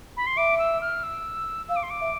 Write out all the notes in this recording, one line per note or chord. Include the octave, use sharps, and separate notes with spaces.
B5
C6
E5 D6
E6
F6
E6
F5 E6
D6
C6
D6
E5